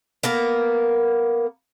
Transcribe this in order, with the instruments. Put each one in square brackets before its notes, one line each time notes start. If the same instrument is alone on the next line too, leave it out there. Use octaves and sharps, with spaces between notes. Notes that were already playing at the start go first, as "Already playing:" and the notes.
[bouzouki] A#3 B3 A#4